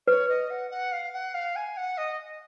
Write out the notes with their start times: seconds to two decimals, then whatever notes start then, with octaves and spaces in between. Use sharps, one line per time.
0.07 B4 C#5
0.29 D#5
0.50 F#5
0.71 F#5
0.92 F5
1.13 F#5
1.34 F5
1.56 G#5
1.77 F#5
1.97 D#5